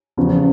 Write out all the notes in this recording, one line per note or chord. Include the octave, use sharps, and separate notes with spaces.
E2 C#3 F3